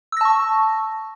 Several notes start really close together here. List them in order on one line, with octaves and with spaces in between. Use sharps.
E6 A#6 A5 C#6